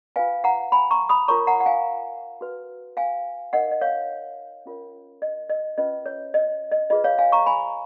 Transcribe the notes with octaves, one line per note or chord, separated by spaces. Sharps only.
F4 B4 F5 G#5
F#5 A#5
G#5 B5
A#5 C#6
B5 D#6
F4 A#4 C#5 A#5 C#6
F#5 A#5
F#5
F5 G#5
F#4 B4
F5 G#5
D#4 A#4 C#5 D#5 F#5
D#5
C#5 F5
C#4 F4 A#4 C#5
D#5
D#5
C#4 F4 B4 D#5
C#5
D#5
D#5
F4 G#4 B4 D#5
C#5 F5
F5 G#5
A#5 C#6
G#5 B5